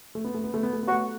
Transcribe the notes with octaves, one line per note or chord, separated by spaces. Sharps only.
A3
B3
A3
B3
A3
B3
A3
B3
F#4
A3